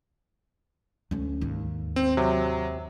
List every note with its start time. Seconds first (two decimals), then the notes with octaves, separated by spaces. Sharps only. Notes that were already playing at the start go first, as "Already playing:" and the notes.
1.11 D2 C#4
1.41 D#2 G#2
1.96 C4
2.17 C3 F#3